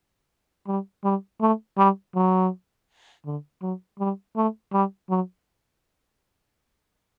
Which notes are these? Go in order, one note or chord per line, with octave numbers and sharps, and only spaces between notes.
G3
G3
A3
G3
F#3
D3
F#3
G3
A3
G3
F#3